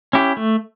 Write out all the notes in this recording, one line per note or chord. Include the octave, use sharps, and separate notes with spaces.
C#4 E4 G4
A3